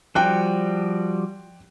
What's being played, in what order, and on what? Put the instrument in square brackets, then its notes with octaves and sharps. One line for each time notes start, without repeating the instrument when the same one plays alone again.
[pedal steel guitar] F3 G3 F#4 [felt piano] G5 F#6